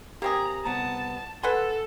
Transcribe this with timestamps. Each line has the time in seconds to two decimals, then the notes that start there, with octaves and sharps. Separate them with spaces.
0.22 A#3 C4 G4 G#4 A#5
0.65 C2 B3 A5 A#5
1.43 A4 B4 F#5 G#5 C6